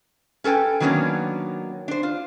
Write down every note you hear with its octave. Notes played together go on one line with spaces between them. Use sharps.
C#4 A4 B4 G5 G#5
D#3 F#3 A#3 B3 C#4 D4
D4 C5
F4